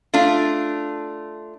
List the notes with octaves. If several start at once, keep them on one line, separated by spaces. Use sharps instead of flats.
A3 D4 F4